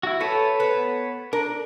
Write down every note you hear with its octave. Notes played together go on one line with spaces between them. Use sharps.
E4 F#4
A3 B4 C#5 A5
B3
D4 A#4